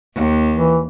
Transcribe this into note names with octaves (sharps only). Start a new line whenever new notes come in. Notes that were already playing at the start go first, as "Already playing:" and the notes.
D#2
E3